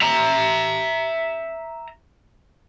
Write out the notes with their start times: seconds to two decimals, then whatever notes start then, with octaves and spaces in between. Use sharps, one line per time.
0.01 E5 A#5